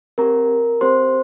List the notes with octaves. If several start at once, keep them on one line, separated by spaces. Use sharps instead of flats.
C4 G4 A#4 A#5
C4 G4 C5 C6